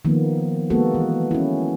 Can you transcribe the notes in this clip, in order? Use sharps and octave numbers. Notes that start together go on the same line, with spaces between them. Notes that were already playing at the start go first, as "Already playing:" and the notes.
D#3 F3 A#3 B3
G#3 A#3 B3 F#4 A4
E3
C#4 E4